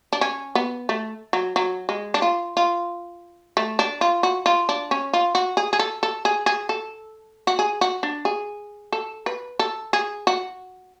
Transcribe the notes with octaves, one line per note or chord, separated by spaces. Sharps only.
D4
C#4
B3
A3
F#3
F#3
G#3
D4
F4
F4
A3
D4
F4
F#4
F4
D4
C#4
F4
F#4
G#4
G#4
A4
A4
G#4
G#4
A4
F#4
G#4
F#4
D4
G#4
A4
B4
A4
G#4
F#4